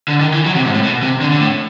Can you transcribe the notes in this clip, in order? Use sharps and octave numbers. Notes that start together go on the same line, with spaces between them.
D3
D#3
E3
F#3
C3
G#2
A2
B2
C3
D3
D3
A2